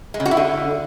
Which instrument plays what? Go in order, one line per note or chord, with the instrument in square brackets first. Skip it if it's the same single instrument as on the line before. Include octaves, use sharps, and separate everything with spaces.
[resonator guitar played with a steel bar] G#3
C#3
F#4
E4
D3